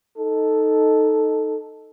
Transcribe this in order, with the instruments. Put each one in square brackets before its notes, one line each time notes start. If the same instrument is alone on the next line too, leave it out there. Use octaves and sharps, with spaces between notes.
[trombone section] D#4 A4